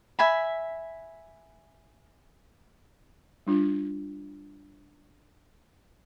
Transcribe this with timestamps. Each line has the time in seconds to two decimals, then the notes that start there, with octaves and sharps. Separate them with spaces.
0.19 E5 G#5 B5
3.47 G3 D4 F4